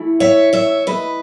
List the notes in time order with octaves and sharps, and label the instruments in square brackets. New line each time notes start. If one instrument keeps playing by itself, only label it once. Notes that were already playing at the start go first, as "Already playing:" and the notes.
Already playing: [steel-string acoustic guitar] E3 A3 E4
C#5 E5
C#5 E5
B4 D#5